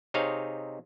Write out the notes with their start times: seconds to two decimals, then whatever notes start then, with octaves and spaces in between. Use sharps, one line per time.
0.14 C3 C4 D#4 G#4 C#5 F5